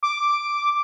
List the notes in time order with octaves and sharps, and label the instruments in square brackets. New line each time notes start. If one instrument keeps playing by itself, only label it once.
[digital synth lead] D6